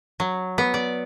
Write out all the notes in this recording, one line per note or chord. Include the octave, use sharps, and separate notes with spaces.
F#3
B3
D5